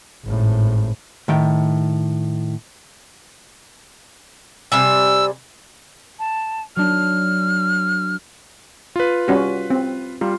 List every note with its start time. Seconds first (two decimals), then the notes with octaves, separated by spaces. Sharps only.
0.24 G#1 A2
1.28 A2 D#3 G5
4.72 C3 G3 G#5 E6
6.19 A5
6.76 F#3 D4 F6
8.96 F4 B4
9.28 G3 C#4 F#4
9.70 C4
10.21 G3 F4